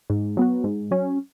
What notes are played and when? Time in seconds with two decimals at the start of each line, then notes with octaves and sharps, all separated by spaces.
0.10 G#2
0.37 F#3 B3 F#4
0.64 G#2
0.91 F#3 C#4